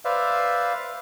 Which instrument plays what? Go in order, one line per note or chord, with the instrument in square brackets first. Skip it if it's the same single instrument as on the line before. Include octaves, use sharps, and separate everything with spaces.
[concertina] B4 C5 D5 E5 F5